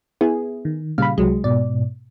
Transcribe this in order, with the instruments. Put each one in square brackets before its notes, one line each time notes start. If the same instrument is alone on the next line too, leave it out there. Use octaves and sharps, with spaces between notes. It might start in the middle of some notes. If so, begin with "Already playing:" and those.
[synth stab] B3 E4 G#4
[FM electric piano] D#3
[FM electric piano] A#2 C#3 G3 [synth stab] F5 B5
[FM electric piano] C2 F#3 [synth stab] G#3
[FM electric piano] G#2 B2 [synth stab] D5